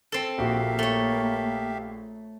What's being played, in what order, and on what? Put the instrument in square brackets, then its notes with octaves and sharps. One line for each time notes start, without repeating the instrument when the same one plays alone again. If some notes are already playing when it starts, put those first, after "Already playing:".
[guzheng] C4 A4
[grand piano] A#1 F#4 [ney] A#3 [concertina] G4 E5 F5
[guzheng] A3 C#5